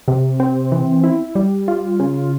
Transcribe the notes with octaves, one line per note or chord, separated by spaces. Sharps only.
C3
C4
E3
E4
G3
F4
C#3